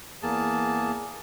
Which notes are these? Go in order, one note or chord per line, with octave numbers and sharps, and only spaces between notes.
E2 A#3 G#4 A5